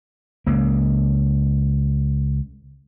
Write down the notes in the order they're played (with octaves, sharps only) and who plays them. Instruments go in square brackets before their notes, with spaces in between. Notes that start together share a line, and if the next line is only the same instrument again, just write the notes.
[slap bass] C#2 A#3